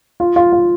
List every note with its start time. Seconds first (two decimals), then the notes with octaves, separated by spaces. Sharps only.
0.20 F4
0.36 F4
0.52 F4